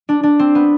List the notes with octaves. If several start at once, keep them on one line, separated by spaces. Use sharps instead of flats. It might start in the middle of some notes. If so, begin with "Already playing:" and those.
D4
D4
C4
B3